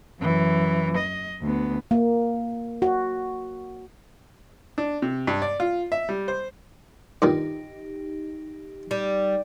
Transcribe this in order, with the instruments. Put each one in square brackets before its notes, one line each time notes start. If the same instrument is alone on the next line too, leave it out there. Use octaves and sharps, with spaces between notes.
[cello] F#2 E3
D#5
D2 B3
[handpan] A#3
F#4
[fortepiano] D4
C3
G2
D5
F4
E5
G3
C5
[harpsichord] G2 A#2 D#3 [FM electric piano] D#4 G4
[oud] G3